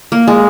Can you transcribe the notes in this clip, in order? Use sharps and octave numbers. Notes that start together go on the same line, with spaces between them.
A#3
G#3